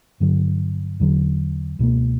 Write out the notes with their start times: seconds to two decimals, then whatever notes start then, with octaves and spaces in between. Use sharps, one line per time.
0.20 G2 D3 F#3
1.00 E2 D3 F#3
1.79 C#2 B2 A#3